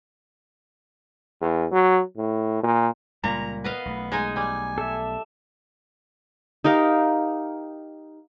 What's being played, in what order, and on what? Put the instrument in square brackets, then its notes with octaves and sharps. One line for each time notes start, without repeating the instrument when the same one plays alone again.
[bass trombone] E2
F#3
A2
A#2
[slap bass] C#2 G3 A#3 [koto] A#2 [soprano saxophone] A#5
[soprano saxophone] B3 [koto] B4 D#5 F5
[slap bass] B1 A3
[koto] G#3 D#4 G#5
[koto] G3 [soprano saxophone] G#5
[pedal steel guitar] A4 E5
[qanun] D#4 G4 A#4 F5